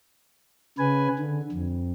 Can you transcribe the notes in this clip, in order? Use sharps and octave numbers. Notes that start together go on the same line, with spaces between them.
C#3 B4 G#5
D3
F2